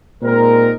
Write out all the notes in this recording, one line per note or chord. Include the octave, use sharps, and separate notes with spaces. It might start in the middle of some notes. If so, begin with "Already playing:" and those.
A#2 G#3 C4 D#4 A#4